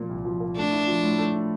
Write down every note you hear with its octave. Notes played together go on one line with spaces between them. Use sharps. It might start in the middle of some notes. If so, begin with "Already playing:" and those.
Already playing: A#2 F3 A#3
C2
F3
A#3
A3 D4
E4
F3
A2
A3
E4